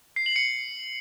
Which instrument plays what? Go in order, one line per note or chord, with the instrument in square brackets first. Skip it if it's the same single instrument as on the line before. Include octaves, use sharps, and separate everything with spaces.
[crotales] C7
F#7
C#7